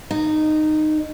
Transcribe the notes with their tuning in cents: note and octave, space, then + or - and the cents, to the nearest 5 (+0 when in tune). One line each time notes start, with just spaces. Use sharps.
D#4 -15